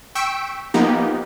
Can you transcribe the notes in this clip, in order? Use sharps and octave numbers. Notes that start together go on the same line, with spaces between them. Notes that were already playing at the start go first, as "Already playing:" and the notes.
G5 C#6 E6 B6 D7
F3 A#3 B3 D#4 G4